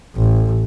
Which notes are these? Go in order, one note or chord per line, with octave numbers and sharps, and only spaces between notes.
A1